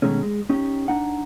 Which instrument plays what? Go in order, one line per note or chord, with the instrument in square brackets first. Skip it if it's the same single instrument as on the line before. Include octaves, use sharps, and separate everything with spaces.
[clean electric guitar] B2 D#3 G#3 A3 C#4
G#3
C#4 D#4 G4
D4 D#4 F#5